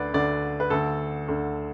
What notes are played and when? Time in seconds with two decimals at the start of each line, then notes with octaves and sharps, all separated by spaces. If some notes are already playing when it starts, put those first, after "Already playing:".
Already playing: D2 D3 B4 D5
0.14 D2 D3 D5
0.60 B4
0.70 D2 D3 A4
1.28 D2 D3